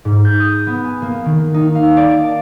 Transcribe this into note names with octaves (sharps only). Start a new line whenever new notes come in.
G#2
G6
D#6
B3
G#5
A#3
D#3
D#4
F5
D5
D7
A5